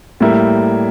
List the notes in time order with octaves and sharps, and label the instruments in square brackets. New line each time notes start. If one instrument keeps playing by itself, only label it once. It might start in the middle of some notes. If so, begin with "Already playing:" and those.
[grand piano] A2 G3 A#3 E4